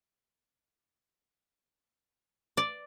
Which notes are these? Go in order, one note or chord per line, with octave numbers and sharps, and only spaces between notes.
D5